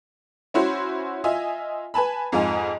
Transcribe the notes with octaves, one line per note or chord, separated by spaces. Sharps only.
C#4 E4 F#4 C5
F4 D#5 E5 G#5
B4 G#5 A5 B5
F2 G#2 F4 D#5 G#5